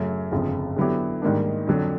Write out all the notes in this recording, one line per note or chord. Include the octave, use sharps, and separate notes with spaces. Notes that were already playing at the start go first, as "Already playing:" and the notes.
Already playing: F#2 C#3 F#3 A3 C#4
G1 F2 C#3 F3
D3 F#3 B3 E4 G4
G#2 D#3 G3 A#3 D4
F2 D3 F#3